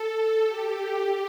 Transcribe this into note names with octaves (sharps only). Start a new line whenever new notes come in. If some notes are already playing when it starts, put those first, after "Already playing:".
Already playing: A4
G4